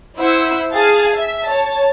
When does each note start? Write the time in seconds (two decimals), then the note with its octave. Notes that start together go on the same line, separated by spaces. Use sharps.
0.17 E4 C5 F#5 E6
0.71 G#4 F5 A5
1.15 E5
1.45 C#5 A5